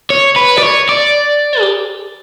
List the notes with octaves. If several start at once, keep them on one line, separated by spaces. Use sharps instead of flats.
C#5
B4
D5
C#5
D5
G4